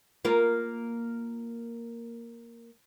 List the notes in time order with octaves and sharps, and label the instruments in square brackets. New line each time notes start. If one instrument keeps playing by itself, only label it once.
[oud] A#3 F4 A#4